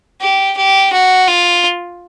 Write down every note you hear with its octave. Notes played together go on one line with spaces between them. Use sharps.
G4
G4
F#4
F4